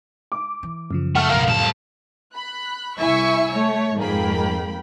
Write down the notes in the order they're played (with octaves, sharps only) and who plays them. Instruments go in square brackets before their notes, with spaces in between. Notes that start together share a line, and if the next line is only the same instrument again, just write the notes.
[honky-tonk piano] D6
[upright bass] E3
[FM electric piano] F#2 C#3 F3
[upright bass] G#3 [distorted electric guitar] A3 [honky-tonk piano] F#5 F6
[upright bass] B1 G#2 [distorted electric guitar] B3 A#4 [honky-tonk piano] F5
[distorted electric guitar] C2 A5 [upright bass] F2 A2
[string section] B5 F#6
C2 E4 E5 G#5 C#6 E6
A3 C#5
F2 G#2 A#3 G#4 G5 B5